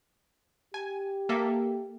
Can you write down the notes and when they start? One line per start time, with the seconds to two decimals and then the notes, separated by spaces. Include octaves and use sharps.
0.74 G4 G#5
1.29 A#3 A4 E5